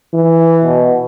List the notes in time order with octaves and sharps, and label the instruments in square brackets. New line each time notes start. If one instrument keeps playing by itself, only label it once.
[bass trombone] E3
[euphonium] B2